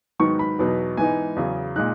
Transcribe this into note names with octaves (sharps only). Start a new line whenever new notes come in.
G#2 D#3 F#3 B3 D#4 C#6
B5
E2 B2 F#3 B3 D#4
G#2 E3 G#3 B3 D#4 G#5
E2 C#3 F#3
A#2 G#3 D#4 F#6